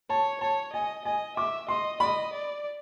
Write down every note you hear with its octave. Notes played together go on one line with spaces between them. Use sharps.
C#5 A5
C#5 A5
D#5 G#5
D#5 G#5
E5 D6
D#5 C6
D#5 B5
D5